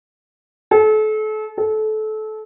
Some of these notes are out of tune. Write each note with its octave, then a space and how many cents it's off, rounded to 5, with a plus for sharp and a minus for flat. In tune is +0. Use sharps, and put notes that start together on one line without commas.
A4 -35
A4 -25